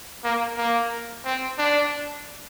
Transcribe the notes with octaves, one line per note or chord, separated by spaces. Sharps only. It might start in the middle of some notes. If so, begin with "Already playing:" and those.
A#3
A#3
C4
D4